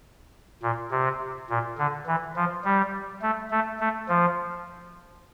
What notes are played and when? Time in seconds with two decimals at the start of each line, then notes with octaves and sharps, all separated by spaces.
0.62 A#2
0.91 C3
1.50 A#2
1.78 D3
2.07 E3
2.36 F3
2.65 G3
3.22 A3
3.51 A3
3.80 A3
4.09 F3